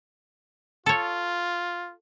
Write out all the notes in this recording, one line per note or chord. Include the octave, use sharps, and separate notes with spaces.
F4 A4 C#5